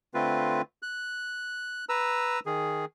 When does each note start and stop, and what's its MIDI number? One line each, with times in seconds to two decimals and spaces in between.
0.14 0.62 50
0.14 0.62 57
0.14 0.62 60
0.14 0.62 65
0.14 0.62 71
0.82 1.85 90
1.89 2.40 71
1.89 2.40 82
1.89 2.40 88
2.46 2.85 51
2.46 2.85 68